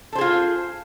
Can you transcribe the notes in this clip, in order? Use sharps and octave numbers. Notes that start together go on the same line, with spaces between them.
F4 G#4 A4 C5